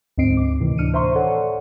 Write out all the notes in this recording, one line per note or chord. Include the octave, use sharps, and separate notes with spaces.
D2 G#2 C4 D#5 C7 D7
D6
D2 A2 C3 D#3 E3
A2 D4 F6 C#7 D#7
C5 E5 A#5 C6 C#6
A4 C#5 D5 F#5